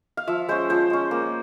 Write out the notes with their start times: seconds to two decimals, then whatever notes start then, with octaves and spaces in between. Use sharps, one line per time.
0.17 F5
0.27 F3 E5
0.49 G#3 C#4 C5
0.70 F3 C5
0.90 G#3 C#4
1.11 A#3